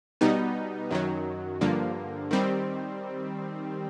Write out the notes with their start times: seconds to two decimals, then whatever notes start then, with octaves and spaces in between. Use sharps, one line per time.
0.21 B2 G3 B3 D#4
0.91 F#2 D#3 F#3
1.61 G2 D3 F3 A#3
2.31 D#3 G3 C4